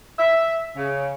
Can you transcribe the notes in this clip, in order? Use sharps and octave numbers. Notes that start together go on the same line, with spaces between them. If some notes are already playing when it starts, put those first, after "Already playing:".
E5
C#3